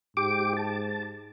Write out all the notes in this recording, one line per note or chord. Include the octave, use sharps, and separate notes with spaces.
G#2 G4 D6
A5